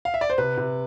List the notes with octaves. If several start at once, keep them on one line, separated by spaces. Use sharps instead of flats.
F5
E5
D5
C5
C3 B4
C3